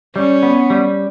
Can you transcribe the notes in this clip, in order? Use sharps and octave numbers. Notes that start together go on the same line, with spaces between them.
G3 C#4
B3
G3